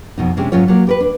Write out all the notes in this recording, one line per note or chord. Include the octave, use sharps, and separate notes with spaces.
F2 B2 D#4
C3 G#3 C#4 D4 G4
G#2 F#3 C#4 F4 C#5
F#3 A#3
G4 A#4 B4
D4